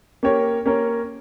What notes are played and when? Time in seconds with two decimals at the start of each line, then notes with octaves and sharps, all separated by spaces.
0.23 A#3 C#4 G4 A#4 C#5
0.66 A#3 C#4 G4 A#4 C#5